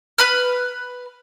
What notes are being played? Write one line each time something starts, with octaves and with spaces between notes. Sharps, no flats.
B4 B5 F6